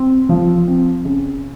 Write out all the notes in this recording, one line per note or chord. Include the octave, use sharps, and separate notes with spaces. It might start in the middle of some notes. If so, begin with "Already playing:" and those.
Already playing: C4
F3
C4
C#3